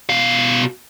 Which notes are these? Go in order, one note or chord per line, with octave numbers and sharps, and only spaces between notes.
B2 F5